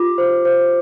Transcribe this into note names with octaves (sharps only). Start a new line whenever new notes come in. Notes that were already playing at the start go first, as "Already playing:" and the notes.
Already playing: F4 G4 D6
C5
C5